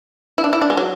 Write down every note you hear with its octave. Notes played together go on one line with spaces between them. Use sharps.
E4
D4
E4
D4
G#3
F#3